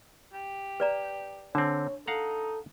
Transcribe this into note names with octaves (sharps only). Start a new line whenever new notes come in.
G4
B4 D5 A#5
D3 C4 D4 C#5
D#4 A4 F5 F#5 A#5